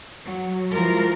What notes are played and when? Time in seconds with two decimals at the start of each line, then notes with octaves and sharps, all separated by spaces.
0.24 F#3
0.72 E3 F3 G#3 F4 A#4